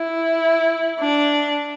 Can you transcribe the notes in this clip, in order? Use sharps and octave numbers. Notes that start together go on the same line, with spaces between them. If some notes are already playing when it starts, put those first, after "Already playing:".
Already playing: E4
D4